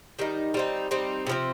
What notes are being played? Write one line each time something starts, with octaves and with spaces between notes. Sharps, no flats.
D#3 G3 D#4
G3 C4 D#4
G3 C4 D#4
C3 F3 C4